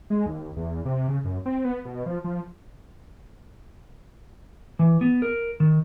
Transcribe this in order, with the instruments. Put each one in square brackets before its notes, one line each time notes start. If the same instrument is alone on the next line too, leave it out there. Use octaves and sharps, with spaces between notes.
[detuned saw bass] G#3
D#2
E2
C3
C#3
F#2
C4
B3
B2
F3
F3
[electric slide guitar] E3
B3
A#4
D#3